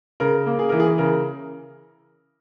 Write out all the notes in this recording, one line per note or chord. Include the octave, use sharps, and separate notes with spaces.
C#3 A#4
A#3
G#4
E3 A#4
G#4
C#3 A#4